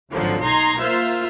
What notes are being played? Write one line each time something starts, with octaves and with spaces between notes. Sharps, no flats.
G#1 D3 F3 F#3
B1 D#4 A#5 C6 G#6
A#3 F4 C5 E5